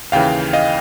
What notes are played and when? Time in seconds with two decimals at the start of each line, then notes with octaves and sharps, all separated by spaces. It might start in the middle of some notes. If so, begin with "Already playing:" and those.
0.12 D#2 C#3 E3 F5 G5
0.53 D#5 F5